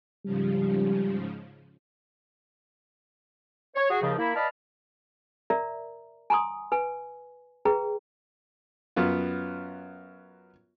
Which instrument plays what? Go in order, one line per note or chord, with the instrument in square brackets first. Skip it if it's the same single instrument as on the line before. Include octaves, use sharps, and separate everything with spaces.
[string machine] G#2 C#3 F3 [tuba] G3
[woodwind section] C#5
F#4 G#4
D#2 C#3 F3
A#3 E4
B4 D5 D#5 F5 A5 B5
[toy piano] A#4 D5 E5 A#5
G#5 A#5 C6 D#6
B4 G#5
G#4 B4 G5 A#5
[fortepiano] F#2 B3 F4